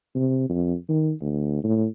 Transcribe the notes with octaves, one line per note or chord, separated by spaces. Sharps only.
C3
F2
D#3
D2
A2